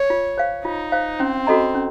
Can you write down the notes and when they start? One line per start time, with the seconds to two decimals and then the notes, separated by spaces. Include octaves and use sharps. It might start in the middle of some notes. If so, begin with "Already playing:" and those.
Already playing: C#5
0.10 F4
0.38 C5 F5
0.65 D#4 F4
0.92 C5 F5
1.20 C4 C#4
1.47 F#4 A4 D#5 A#5
1.75 C#4